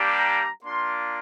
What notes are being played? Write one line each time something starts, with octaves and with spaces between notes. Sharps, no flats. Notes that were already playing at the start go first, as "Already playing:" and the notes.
Already playing: G3 A#3 D4 G4
A#5
A#3 D4 F4 C6